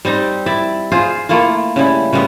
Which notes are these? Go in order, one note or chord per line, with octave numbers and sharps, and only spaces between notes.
G3 C4 D#4
E4 D5 E5
F4 G#4 C5
A3 A#3 E4 F4
C#3 G3 E4
C#3 G3 G#3 B3